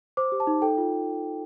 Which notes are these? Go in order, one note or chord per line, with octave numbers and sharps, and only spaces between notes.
C5 D6
G4
A5
D#4
A4 G5
F4